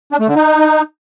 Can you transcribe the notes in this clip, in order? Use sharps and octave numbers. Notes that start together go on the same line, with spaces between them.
D4
A3
D3
D#4